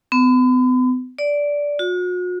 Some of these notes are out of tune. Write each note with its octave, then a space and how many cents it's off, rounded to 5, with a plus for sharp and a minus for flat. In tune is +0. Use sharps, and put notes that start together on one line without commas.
B3 +40
D5 -10
F#4 -45